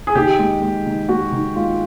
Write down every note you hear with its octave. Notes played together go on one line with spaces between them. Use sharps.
G#4
D#3 G4
G#3
G#3
D#3
G#3 F#4
D#3
G#3 F4